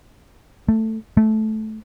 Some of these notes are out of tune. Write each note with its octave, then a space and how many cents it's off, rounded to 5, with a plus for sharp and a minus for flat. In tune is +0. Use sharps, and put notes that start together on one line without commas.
A3 +10
A3 -15